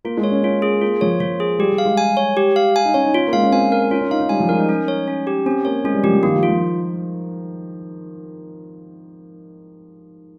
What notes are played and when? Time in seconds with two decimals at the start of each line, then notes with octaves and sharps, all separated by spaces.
0.05 A#3 F4
0.17 G#3
0.24 C#5
0.31 C#4
0.43 C#4 F4
0.62 G#4
0.82 A#3 F4
1.01 F3 C#5
1.20 F3 F4
1.40 G#4
1.59 G3 G4
1.73 G3
1.78 F5
1.85 G#3
1.97 G#5
2.17 C#5
2.37 G4
2.56 F5
2.76 G#5
2.85 D#4
2.94 C#4 C#5
3.04 D#4
3.13 C#4 F4
3.28 A#3
3.33 G#3 F5
3.43 C#4
3.52 C4 G#5
3.72 A#4
3.91 C#4 F4
4.01 C#4
4.10 D#4 F5
4.20 D#4
4.29 G3 G#5
4.40 F3
4.49 G#3 A#4
4.58 D#4
4.69 C#4
4.88 C#5
5.08 C#4
5.27 G4
5.46 C4 C#4
5.65 A#3 C#5
5.84 G#3 C#4
5.94 G3
6.04 F3 G4
6.14 F3
6.23 D#3 A#3
6.36 F3
6.43 F4
6.49 F3